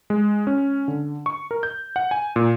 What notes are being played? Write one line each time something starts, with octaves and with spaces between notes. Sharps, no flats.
G#3
C#4
D3
C#6
A#4
G6
F#5
G#5
A#2